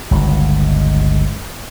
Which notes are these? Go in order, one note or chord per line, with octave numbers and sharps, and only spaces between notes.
G1 C#2